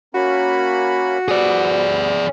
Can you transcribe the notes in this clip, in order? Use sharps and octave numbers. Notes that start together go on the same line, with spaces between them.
A#3 C#4 F#4 B5
G3 B3 C4 G#4 D5